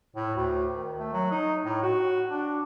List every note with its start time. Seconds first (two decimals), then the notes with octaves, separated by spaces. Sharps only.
0.15 A2
0.35 D2
0.76 D#3
0.99 A3
1.13 F#3
1.31 D#4
1.65 A2
1.83 F#4
2.31 D4